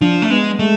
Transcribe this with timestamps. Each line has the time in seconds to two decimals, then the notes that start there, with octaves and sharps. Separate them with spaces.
0.01 F3 D4
0.22 A3
0.30 G#3 B3
0.59 G#3 A3